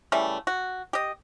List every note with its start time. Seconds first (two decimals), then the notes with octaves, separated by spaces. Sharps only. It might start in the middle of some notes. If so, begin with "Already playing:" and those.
0.12 C#3 E3 G3 A3
0.47 F#4
0.93 G4 D#5